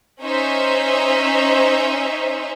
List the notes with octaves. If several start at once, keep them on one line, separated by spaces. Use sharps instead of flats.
C#4 D#4 C5 E5